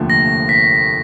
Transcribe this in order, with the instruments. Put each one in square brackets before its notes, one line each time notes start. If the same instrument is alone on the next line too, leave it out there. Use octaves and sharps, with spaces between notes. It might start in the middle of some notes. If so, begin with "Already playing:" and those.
Already playing: [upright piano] F1 D#2 D3 F3 A3
[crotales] A#6
B6